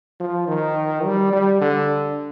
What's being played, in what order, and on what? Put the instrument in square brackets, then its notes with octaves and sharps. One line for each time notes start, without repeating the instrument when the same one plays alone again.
[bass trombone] F3
D#3
G3
G3
D3